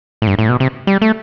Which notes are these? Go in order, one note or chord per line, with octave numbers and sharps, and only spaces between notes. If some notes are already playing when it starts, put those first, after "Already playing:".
A2
G2
A2
B2
C3
G3
A3